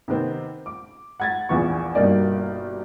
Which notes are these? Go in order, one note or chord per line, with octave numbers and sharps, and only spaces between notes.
C3 D#3 B3 C4
D6
F#5 G#6 A6
A#1 E2 E3 B3 F4 C#6
G1 G2 B2 A#3 D#4 D5